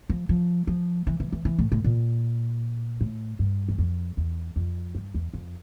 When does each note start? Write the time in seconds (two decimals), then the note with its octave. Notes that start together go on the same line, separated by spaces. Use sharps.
0.09 F3
0.29 F3
0.67 F3
1.07 E3
1.20 E3
1.32 E3
1.45 E3
1.59 A2
1.72 A2
1.84 A#2
3.01 A2
3.39 G2
3.68 E2
3.78 F2
4.17 E2
4.56 F2
4.95 G2
5.14 E2
5.33 F2